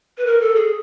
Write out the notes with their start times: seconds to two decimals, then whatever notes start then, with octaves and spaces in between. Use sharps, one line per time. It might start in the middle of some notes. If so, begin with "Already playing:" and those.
0.17 B4
0.26 A#4
0.41 A4
0.55 G#4